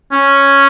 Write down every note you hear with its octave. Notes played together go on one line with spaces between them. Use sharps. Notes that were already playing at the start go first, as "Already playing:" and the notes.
C#4